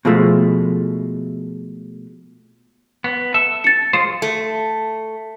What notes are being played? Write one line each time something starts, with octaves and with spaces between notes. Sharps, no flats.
B2 F3 G#3 A3
B3
A4 E5
A6 C#7
G#3 F4 C5
A3